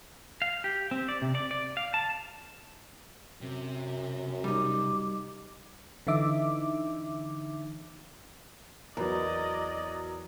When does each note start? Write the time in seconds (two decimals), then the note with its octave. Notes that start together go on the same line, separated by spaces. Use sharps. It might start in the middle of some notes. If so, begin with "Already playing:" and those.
0.42 F5
0.64 G4
0.91 C4
1.09 D5
1.22 C3
1.35 D5
1.51 D5
1.77 F5
1.94 A5
3.41 F#2 C3
4.44 G3 D#4 D6
6.07 D3 E3 D#4 E5 D6
8.97 E2 F#3 A#4 D5 D#5